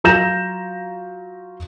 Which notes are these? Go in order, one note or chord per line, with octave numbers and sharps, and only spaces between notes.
F#3 F4 A#5 G6 A#6 E7